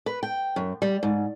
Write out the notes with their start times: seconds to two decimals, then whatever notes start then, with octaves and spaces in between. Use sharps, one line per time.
0.06 B4
0.23 G5
0.56 F#2
0.82 G3
1.03 G#2